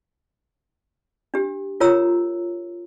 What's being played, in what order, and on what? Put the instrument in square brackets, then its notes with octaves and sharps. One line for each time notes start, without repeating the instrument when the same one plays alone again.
[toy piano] D4 G4
F4 A#4 C#5 A#5 E6